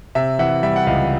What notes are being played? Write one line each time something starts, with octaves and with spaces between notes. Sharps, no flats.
C3 E5
E3 E5 F#5
G3 E5
F#5
C#2 D#5 F5